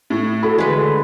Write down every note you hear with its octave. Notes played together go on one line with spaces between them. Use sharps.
A2
F#4 A4 B5
D3 G#3 B4